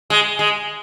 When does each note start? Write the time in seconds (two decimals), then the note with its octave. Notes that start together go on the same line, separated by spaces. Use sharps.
0.10 G#3
0.39 G#3